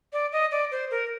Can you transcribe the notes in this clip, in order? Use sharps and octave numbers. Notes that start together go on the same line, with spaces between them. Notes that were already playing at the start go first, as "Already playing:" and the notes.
D5
D#5
D5
C5
A#4